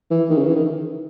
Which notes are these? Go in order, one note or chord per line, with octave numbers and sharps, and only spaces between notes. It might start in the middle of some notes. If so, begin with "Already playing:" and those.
E3
D#3
C#3
E3
D#3